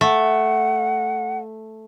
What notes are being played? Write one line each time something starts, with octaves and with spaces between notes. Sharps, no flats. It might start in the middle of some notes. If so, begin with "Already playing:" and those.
A3 F#5